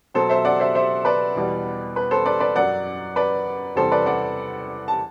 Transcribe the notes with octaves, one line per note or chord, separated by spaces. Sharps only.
B2 F#3 A4 C5
C5 E5
D5 F#5
C5 E5
C5 E5
B4 D5
E2 B2 G3
B4
A4 C5
B4 D5
B4 D5
F#2 F#3 D5 F#5
B4 D5
E2 C3 G3 A4 C5
B4 D5
D5 F#5
A5